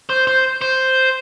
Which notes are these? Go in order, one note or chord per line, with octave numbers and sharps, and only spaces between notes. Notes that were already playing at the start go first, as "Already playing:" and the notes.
C5
C5
C5